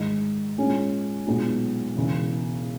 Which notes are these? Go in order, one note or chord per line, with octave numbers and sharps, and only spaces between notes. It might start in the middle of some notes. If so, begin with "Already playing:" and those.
Already playing: G#2 D#3 G#3 D#4
A#2 G#3 C#4
B1 A#2 G#3 B3
E1 E2 C#3